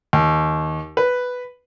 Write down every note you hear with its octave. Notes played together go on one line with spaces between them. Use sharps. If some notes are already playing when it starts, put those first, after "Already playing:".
D#2
B4